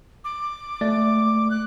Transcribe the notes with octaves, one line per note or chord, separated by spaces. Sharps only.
D6
A3 D5
F#6